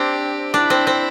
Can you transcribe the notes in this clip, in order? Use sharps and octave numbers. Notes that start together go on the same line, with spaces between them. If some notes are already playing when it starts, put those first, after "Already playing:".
Already playing: C4 D4 G4
D4 E4
C4
C4